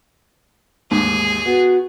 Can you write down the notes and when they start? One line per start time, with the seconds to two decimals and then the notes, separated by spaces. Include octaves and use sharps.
0.91 A1 D#2 G#2 G#4
1.46 B3 F#4